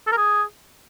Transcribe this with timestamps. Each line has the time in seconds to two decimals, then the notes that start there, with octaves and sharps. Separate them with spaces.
0.07 A4
0.12 A#4
0.17 G#4